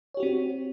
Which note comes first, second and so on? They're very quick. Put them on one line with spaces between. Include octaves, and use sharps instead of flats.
C#5 G4 F#4 C4